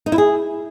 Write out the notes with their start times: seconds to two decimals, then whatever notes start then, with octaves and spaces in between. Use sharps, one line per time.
0.06 D#4
0.12 E4
0.18 G#4